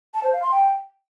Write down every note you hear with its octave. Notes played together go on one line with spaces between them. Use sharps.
A5
C5
F5
C6
G5